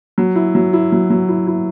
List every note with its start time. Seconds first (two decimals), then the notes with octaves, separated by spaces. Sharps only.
0.18 F#3
0.36 E4
0.55 F#3
0.73 E4
0.92 F#3
1.10 F#3
1.29 E4
1.47 E4